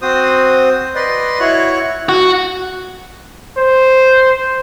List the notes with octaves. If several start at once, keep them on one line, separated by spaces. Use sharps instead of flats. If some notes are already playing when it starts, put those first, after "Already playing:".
C4 F#4 C5 D#6
B4 D5 D#5 C6
E4 F#4 C#5 C#6 F#6
F#4
C5